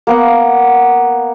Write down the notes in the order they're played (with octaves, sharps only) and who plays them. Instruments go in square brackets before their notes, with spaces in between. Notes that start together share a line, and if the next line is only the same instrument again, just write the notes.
[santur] A#3 B3 F#5